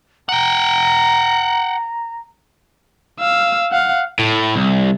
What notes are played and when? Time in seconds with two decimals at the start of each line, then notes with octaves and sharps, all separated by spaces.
0.29 F#5 G5 A#5
3.20 F5 E6
3.71 F5 F#5
4.19 A2
4.56 C2